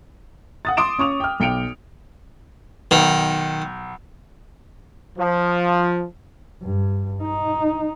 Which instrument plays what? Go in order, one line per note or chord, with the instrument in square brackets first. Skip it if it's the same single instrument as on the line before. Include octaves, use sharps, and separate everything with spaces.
[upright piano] F#5 D#6 A6
C6 D6 D#6 D7 E7
C#4 C#6 D#6 F7
G5 F6
B1 G5 C#7 D7 F7
[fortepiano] B1 [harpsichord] D#3
[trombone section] F3
[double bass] G2
D#4